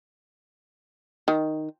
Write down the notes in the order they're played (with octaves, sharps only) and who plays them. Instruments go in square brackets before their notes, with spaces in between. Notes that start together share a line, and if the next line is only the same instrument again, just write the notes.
[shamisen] D#3